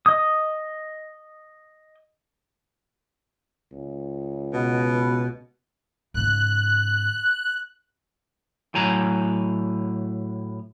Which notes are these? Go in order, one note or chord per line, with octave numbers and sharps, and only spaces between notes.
D#5 D#6
C#2
B2
G#2 C#3 F#6
A2 F#3 G#5 A#5